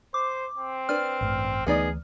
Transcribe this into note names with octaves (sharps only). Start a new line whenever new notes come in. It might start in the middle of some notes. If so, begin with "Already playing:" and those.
C5 D6
C4
D4 B4 F6
A1 G2 A3
D2 E3 A3 B3 D#4 G#4 D5